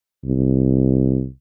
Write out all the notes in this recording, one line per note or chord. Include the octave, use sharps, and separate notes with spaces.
C2